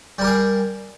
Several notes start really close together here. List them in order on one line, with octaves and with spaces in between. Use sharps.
G3 A#4 G4 G#4